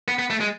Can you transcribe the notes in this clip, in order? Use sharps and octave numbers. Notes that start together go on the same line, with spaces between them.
B3
B3
A3
G#3